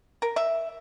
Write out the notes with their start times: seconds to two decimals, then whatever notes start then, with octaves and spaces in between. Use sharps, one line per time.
0.22 A#4
0.36 E5